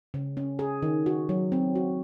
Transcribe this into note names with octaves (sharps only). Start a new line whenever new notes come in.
C#3
C#4
G#4
D#3
F#4
F#3
C4
F#4